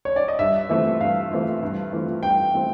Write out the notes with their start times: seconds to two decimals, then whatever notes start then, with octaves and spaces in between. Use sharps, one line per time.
0.05 C#5
0.16 D5
0.28 D#5
0.39 G2 E5
0.69 E3 A3 C4 F4
1.00 G2 F5
1.31 E3 A3 C4 F4
1.62 G2
1.93 E3 A3 C4 F4
2.23 G2 G5
2.54 E3 A3 C4 F4